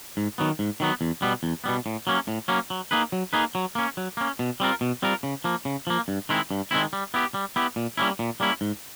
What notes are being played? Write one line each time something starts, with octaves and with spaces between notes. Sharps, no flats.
G#2
D#3 F#3 B3
G#2
D#3 F#3 B3
E2
B2 G3 B3
E2
B2 G3 B3
A2
F#3 A#3 C#4
A2
F#3 A#3 C#4
F#3
A#3 D#4 G#4 B4
F#3
A#3 D#4 G#4 B4
F#3
A#3 C#4
F#3
A#3 C#4
B2
G3 C4 F4 A#4
B2
G3 C4 F4 A#4
C#3
F3 A#3
C#3
F3 A#3
G2
D#3 G#3 C4 E4
G2
D#3 G#3 C4 E4
G3
B3 E4 G4
G3
B3 E4 G4
A#2
G3 A#3 C#4 E4
A#2
G3 A#3 C#4 E4
G#2